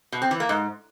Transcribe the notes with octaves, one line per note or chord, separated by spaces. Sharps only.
B2
C4
E3
A#3
G#2